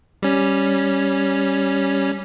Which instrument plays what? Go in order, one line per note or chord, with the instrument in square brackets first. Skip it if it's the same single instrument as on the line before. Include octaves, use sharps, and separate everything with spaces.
[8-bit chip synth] G3 C#4